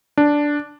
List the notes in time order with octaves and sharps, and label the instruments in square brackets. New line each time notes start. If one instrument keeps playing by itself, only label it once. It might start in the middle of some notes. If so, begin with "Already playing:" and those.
[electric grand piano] D4